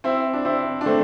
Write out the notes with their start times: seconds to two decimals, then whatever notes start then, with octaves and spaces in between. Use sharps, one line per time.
0.04 C4 E4
0.33 D4
0.45 C4 E4
0.81 D4
0.86 A3 C4